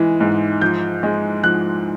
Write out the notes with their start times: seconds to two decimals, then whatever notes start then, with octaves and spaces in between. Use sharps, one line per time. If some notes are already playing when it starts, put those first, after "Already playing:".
Already playing: E3 G#3
0.20 G#2
0.61 F3 G6
1.03 G#3
1.44 F3 F#6